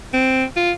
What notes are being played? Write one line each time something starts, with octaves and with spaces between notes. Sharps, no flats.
C4
F4